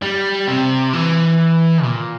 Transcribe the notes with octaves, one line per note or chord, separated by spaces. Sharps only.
G3
C3
E3
A#2